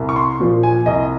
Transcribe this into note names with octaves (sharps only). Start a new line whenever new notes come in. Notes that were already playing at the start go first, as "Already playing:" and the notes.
Already playing: C2
C#6
C6
A#2 F3
G#5
C2 D#5